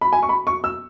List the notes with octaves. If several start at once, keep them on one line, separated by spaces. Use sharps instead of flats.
B5
G#5
C#6
B5
C#6
E6